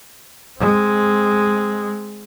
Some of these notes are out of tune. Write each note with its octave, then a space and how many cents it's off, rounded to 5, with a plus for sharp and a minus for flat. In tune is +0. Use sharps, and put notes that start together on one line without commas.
G#3 +0 C4 +0